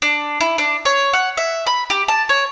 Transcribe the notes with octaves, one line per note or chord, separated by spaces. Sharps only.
D4
E4
D4
C#5
F#5
E5
B5
G4
A5
C#5